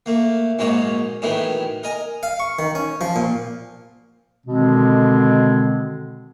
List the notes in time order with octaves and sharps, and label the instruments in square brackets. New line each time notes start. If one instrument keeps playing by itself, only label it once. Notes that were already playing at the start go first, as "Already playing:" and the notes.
[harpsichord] A3 A#3
A#1 G#2 F#3 A#3 C#5 D#5
A2 D#3 E3 F#3 B3
A#4 D#5 G#5 A#5
F5
C#6
D#3
C#4
F3
A#2
[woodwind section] B2 D3 D#3 G#3 C4